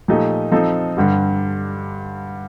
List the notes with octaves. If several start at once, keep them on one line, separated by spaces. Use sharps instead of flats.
A#2 F3 A3 D#4 G4
F3 C4 D#4 A4
G2 D3 G3